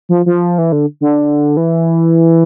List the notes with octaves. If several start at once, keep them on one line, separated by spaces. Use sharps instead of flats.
F3
F3
E3
D3
D3
E3